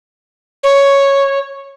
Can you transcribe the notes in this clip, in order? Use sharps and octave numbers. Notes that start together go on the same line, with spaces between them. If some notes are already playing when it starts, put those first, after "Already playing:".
C#5